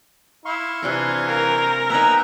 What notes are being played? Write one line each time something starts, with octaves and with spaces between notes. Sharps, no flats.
E4 F5 C6 C#6
C3 E3 D4 G#5 A#5
A#4 F5 G5 C#6
B3 D#4 E5 G5 G#5 A#5 E6